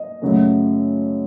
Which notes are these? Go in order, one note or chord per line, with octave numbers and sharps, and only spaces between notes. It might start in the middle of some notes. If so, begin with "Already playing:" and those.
Already playing: D#5
F#2 C#3 F#3 A3